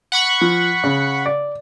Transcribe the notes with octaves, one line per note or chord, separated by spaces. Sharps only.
F#5 B5 C#6
F3
C#3
D5